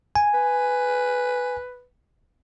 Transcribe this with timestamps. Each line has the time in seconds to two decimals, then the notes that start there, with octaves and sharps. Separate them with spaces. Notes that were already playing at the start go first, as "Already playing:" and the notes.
0.15 G#5
0.34 B4